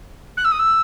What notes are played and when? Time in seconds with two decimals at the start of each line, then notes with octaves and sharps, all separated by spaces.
0.37 F#6
0.44 E6
0.51 D#6
0.59 E6